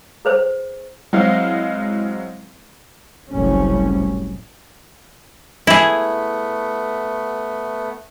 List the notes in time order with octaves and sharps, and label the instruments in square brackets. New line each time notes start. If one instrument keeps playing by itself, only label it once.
[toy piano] G#4 B4 C5
[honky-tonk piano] F#3 G#3 C4 E4 D#5 F5
[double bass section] F#1 C2 A2 G3 C#4
[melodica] A3 B3 [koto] E4 G#4